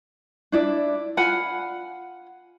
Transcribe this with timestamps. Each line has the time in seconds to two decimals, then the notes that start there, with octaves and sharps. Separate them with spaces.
0.52 D4 E4 D5
1.17 F4 F#5 G#5 B5